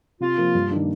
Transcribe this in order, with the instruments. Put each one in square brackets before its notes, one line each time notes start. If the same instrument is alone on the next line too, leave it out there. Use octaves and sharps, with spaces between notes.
[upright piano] C3 [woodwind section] F4
[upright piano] F3 A#3
G2
D#3 A#3 D4